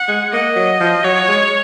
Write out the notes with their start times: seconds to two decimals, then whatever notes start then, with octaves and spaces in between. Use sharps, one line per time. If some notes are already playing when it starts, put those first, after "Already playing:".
Already playing: F#5
0.08 G#3
0.32 A#3 D#5
0.56 F#3
0.80 F3
1.04 F#3 C#5
1.28 G#3